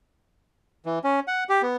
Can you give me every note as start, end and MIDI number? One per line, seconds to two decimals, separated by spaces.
0.86 0.99 52
1.04 1.20 61
1.28 1.44 78
1.49 1.62 67
1.62 1.77 59